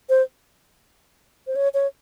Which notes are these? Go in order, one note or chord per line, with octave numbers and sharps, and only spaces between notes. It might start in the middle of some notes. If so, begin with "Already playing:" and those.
C5
C5
C#5
C#5